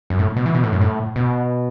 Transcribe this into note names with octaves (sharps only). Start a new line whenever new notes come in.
F#2
A2
B2
E3
B2
A2
F#2
A2
B2